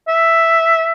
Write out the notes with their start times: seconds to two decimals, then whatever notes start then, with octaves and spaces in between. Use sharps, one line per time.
0.08 E5